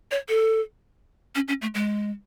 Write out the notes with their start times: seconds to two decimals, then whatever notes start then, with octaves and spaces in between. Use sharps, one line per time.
0.11 C#5
0.29 A4
1.35 C#4
1.48 C#4
1.62 A3
1.75 G#3